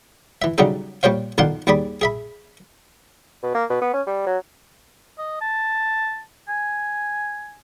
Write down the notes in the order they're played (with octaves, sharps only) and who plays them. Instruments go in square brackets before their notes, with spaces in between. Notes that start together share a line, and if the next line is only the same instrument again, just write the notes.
[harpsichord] E3 E5
C#3 F#3 G3 D4 D#4 A4
A#2 G3 C5 C#5 F5
B1 D#3 D4 F4 F#5 C6
D#2 G3 G#4 D5 B5
G#4 E5 B5
[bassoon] B2
A#3
B2
B3
C#4
G3
F#3
[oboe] D#5
A5
G#5